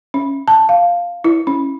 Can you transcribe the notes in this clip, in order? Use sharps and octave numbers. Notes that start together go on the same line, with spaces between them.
C#4
A5
F5
E4
C#4